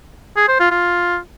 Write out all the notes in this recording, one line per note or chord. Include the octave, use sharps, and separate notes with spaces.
G#4
C5
F4
F4